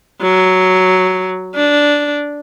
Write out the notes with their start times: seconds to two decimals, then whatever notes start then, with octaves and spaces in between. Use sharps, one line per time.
0.22 F#3
1.55 D4